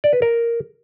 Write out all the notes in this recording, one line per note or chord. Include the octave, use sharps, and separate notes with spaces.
D5
B4
A#4